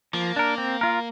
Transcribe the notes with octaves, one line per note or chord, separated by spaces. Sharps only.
F3 A#3
D4 A#4
C4
F4 A#4